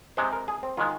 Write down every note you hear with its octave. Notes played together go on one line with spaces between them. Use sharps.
C3 G#3 C5
A#4
G#4
C4
D#3 G#3 F4